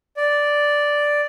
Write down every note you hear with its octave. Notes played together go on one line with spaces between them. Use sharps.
D5